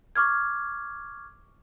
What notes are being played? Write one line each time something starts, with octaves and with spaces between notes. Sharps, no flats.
C#6 D6 F6 G#6